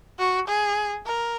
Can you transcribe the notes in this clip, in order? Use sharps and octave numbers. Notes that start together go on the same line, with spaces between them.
F#4
G#4
A#4